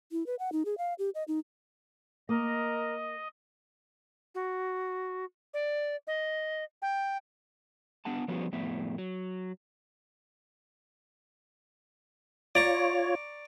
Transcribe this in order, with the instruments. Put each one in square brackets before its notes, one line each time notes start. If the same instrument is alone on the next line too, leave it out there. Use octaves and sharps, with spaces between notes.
[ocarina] E4
B4
F#5
D#4
G#4
F5
G4
D#5
D#4
[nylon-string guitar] A#3 [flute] A#4 [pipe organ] D#5
[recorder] F#4
D5
D#5
G5
[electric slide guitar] B3 D4 F#5 A5
F3 G3 B3 C#4 F#4
F2 A2 B3 E5
F#3
[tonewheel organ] F4 C#5 [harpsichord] D5 A#5 C#6